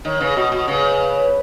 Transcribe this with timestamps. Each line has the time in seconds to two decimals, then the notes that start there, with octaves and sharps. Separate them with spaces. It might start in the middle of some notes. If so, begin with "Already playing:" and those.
0.05 D#3 C#5
0.20 C#3 B4
0.36 B2 F#4
0.52 B2 F#4
0.67 C#3 B4